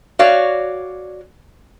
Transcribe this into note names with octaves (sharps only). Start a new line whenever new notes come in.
F#4 C#5 D5 F5